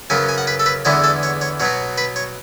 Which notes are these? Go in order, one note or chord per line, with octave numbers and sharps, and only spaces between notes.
F#2 C#3 F#3 B3 G#5
G#5
F#5
B4
A4
B4
E2 D3 G#3 B3 E4 C#5
A4
C#5
C#5
B2 F#3 B3 C#5
B4
C#5